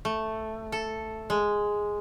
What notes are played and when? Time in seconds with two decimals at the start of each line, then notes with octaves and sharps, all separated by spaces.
0.05 A3
0.72 A4
1.30 G#3